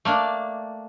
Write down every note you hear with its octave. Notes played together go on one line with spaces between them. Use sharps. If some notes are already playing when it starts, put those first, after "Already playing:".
A3 A#3 D4